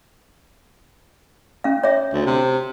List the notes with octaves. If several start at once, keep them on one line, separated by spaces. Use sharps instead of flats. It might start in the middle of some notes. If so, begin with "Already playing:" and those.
C#4 F5
C#5 E5
D2
C3